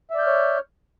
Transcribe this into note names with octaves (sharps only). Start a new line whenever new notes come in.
C#5 D5 E5 F6 G6